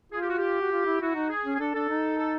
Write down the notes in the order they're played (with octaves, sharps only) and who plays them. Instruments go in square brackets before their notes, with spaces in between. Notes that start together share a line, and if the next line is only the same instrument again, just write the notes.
[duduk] F4 [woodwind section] G#4
[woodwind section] G4
F#4
G4
[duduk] F#4
F4
E4
[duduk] E4 [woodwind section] F#4
[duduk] D#4
[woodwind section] G#4
[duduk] C#4
[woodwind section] G#4
[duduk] D4 [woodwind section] A4
[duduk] D4 [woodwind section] A4
[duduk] D#4
[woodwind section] A4